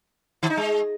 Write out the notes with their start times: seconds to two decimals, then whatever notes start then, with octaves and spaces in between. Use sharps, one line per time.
0.43 D#3
0.50 D#4
0.57 G#3